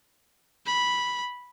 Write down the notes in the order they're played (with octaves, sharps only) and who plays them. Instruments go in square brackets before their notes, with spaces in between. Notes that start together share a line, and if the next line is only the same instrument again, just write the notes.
[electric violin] B5